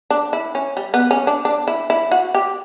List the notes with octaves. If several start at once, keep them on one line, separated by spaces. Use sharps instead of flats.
D4
E4
C#4
G3
B3
C#4
D4
D4
E4
E4
F#4
G4